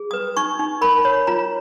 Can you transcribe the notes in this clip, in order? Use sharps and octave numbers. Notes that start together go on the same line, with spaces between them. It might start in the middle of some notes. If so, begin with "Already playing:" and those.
Already playing: G#4
B4 D#6
D#4 C#6
D#4
A#4 B5
C#5
F4 A#5